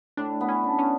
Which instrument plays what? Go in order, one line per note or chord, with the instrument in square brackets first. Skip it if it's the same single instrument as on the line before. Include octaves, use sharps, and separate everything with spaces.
[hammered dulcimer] A2 [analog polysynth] D4
[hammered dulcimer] B3
[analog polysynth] C#4
[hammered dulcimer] D4
[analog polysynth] C#4